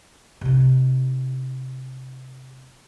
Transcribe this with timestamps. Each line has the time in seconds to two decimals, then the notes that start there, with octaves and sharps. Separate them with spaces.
0.41 C3 D#4